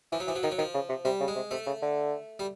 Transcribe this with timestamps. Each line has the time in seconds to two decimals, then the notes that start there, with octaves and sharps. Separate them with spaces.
0.12 E3 F3
0.20 F#3
0.27 E3 F3
0.36 F#3
0.43 D#3 F3
0.51 F#3
0.59 D#3 F3
0.74 C#3
0.89 C3
1.05 C3 G3
1.20 C#3
1.28 G#3
1.36 C3
1.51 C3 A3
1.67 C#3
1.82 D3
2.39 G3